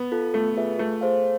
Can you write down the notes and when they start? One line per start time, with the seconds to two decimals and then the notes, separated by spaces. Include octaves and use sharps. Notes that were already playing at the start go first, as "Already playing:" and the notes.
Already playing: B3
0.12 F4 A4
0.34 A3 B3
0.57 F4 G#4 B4 E5
0.78 A3 F4
1.01 G#4 C5 F5